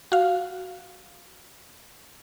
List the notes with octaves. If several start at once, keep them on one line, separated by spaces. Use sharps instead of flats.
F#4 F5